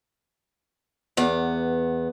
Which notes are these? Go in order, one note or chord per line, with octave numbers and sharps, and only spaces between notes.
E2 B3